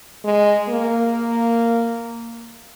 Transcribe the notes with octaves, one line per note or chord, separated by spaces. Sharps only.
G#3
A#3